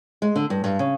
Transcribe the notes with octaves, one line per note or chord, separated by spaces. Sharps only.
G#3
D3
G2
G2
C#3